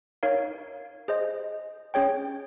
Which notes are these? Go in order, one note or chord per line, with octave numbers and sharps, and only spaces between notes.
D#4 A#4 C#5 F5
G#4 C5 D#5
C#4 G#4 C#5 G5